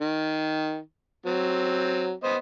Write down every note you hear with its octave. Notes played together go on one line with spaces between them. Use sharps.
D#3
F#3 C4
B3 C5 D#5